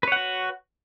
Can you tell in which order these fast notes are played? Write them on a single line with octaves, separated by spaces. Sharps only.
B4 C#5 F#5 F#4